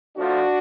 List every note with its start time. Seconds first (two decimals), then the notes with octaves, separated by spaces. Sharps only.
0.17 A2 F3 D4 F#4